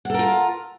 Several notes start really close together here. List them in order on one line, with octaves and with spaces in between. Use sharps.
F#5 A4 A#4 F4